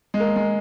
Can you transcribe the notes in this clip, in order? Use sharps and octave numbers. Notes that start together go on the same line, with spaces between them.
G#3
A#3
G#3